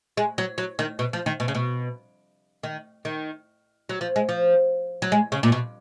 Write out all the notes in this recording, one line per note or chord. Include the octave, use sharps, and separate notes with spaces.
G#3
F#3
F#3
D#3
B2
F3
D#3
B2
C#3
B2
D#3
D#3
F#3
F3
G#3
F3
F#3
G#3
C#3
A#2
B2